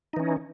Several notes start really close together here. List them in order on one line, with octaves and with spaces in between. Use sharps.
D#4 E3 C#4